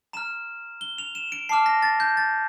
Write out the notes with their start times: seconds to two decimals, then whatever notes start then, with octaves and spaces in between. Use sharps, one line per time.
0.13 A#5 F6 E7
0.81 G7
0.98 F7
1.15 E7
1.32 D7
1.49 A5 D6 F6 C7
1.66 A#6
1.82 A6
2.00 G6
2.17 A6